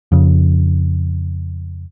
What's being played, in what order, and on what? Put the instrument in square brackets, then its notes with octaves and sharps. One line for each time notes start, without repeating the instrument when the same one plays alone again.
[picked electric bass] F2 C#3